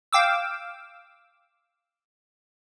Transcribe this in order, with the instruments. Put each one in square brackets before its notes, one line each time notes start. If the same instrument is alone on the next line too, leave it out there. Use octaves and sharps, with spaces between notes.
[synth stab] F5 G5 D6 E6